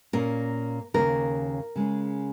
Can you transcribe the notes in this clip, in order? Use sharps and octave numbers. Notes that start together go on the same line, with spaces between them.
A#2 A#3 C#4 A#4
D#2 C#3 A#3 A#4
C#3 G#3 C#4